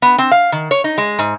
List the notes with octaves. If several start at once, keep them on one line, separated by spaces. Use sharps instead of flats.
B3
C4
F5
D#3
C#5
D#4
G#3
G#2